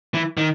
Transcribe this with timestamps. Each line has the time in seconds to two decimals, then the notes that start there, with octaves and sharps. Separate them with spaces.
0.14 E3
0.37 D#3